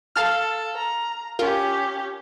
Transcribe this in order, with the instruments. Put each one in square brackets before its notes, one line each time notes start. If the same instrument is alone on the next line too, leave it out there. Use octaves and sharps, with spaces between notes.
[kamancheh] A4 [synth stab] F5 A5 F6
[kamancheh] A#5
[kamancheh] C#4 G4 [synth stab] F4 A#4